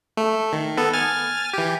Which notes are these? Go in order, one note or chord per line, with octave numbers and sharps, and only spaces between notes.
A3
D#3
B3 A4
G#5 F6 A6
E3 G4